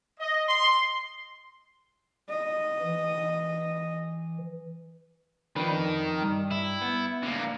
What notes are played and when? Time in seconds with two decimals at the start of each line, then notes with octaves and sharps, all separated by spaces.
0.20 D#5
0.49 C6
2.29 D#5
2.81 E3
5.56 D#3 F3 D4 B4
5.76 F2
6.21 G2
6.51 E4
6.82 B3
7.23 D3 A#3